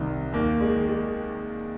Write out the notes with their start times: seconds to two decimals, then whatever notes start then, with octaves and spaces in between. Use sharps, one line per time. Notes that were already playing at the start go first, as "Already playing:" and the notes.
Already playing: C2 C3 D#3
0.33 D#2 A#3
0.61 G#3
0.75 D#3
0.88 G#3